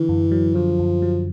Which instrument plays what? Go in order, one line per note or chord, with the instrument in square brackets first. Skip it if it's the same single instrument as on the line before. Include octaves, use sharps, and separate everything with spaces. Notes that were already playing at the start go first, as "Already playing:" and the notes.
Already playing: [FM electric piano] D3 [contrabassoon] E3
[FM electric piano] F#2
F#3
[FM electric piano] D3 [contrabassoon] F3
[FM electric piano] F#2
F#3